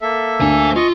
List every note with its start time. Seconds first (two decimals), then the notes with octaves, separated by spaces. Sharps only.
0.01 A#3 A4 E5
0.41 D2 C5 G#5
0.76 F4 D#5 C#6